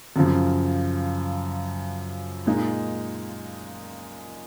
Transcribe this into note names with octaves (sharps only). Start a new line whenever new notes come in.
F#2 C#3 F3
A#2 G#3 D#4